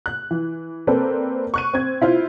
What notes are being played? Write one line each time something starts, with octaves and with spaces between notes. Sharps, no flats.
F#6
E3
A#3 C4 A4 B4 D5
C#6 F#6 D#7
C4 G#6
E4 F4 C5